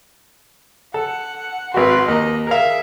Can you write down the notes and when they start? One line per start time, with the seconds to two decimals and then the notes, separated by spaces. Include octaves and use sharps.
0.94 A4 F#5
1.74 G#1 F#4 B4 C6
2.08 D#2 D#5 A#5
2.47 G#4 A#4 E5 F5